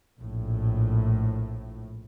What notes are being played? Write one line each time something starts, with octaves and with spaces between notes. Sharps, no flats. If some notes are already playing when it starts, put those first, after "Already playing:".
A#1 A2